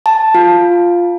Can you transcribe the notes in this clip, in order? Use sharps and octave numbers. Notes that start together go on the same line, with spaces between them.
A5
F4